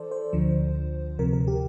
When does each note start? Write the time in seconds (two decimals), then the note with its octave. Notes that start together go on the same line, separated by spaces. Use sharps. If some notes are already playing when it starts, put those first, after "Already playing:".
Already playing: E3 A4 C5 D5
0.11 C5
0.33 D2 D3 F3
1.19 D2 C3 F3 A#4
1.33 A#4
1.48 G4